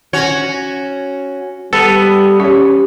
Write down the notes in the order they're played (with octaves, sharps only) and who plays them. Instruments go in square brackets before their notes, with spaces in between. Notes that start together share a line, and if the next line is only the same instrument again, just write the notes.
[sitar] C#4 F#4 C#5
[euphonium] G3 [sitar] B3 [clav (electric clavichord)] A4
[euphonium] C#4 [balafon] G4 C#5